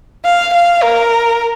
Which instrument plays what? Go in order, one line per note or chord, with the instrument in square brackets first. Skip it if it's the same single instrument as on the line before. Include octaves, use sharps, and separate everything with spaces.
[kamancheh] F5
F5
A#4